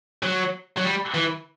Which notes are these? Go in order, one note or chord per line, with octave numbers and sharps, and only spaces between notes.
F#3
F#3
G3
E3